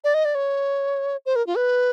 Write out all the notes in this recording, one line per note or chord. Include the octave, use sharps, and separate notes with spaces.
D5
D#5
D5
C#5
C5
A#4
F4
B4